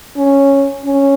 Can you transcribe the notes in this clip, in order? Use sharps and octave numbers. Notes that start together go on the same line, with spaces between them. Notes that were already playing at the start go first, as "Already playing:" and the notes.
C#4
C#4